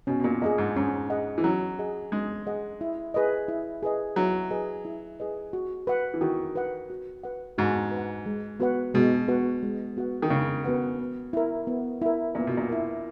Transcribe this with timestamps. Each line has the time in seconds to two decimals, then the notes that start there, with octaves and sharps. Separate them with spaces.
0.07 B2 C#4
0.20 B2
0.24 A#2
0.42 A#2 G#4 D#5 F#5
0.58 G#2
0.76 G#2 C#4
1.10 G#4 D#5 F#5
1.38 E3
1.44 F#3 C#4
1.79 G#4 D#5 F#5
2.12 G#3 C#4
2.47 G#4 D#5 F#5
2.81 E4
3.14 G#4 B4 D#5
3.48 E4
3.83 G#4 B4 D#5
4.16 F#3 E4
4.51 G#4 B4 D#5
4.85 E4
5.20 G#4 B4 D#5
5.53 F#4
5.87 B4 F#5
6.14 E3
6.21 D#3 F#4
6.55 B4 F#5
6.90 F#4
7.24 B4 F#5
7.58 G#2 F#4
7.91 B4 F#5
8.26 G#3
8.60 B3 F#4 B4 F#5
8.94 B2 G#3
9.28 B3 F#4 B4 F#5
9.63 G#3
9.97 B3 F#4 B4 F#5
10.22 D#3
10.30 C#3 G#3
10.64 B3 F#4 B4 F#5
10.99 B3
11.33 E4 A#4
11.67 B3
12.01 E4 A#4
12.35 A#2 B3
12.47 B2
12.57 A#2
12.69 E4 A#4